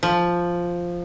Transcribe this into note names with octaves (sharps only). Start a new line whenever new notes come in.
F3